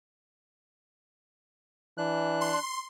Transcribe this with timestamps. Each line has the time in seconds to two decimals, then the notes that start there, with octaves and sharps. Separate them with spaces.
1.98 E3 D4 F#6
2.41 C6